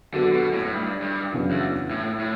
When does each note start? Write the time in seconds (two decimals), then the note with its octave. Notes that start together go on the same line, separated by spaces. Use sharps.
0.14 D3 F#3 B3 F#4 A4
0.34 B2
0.53 A2
0.65 A2
0.73 G2
1.02 G2
1.31 F#2 C#3 E3 B3 D4
1.51 E2
1.90 A2
2.19 A2